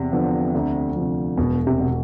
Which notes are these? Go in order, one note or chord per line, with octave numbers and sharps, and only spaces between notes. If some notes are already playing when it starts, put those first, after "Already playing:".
Already playing: E2 C3
D3 F3 B3
D2
C3 F3
E1 B2
C3
B2